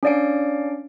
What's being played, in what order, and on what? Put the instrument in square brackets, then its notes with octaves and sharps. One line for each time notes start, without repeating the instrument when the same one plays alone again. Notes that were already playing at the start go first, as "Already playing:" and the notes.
[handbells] C#4 D4 D5 F5 D7